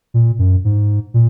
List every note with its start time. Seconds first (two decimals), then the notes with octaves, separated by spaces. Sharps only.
0.14 A#2
0.39 F#2
0.65 G#2
1.14 A#2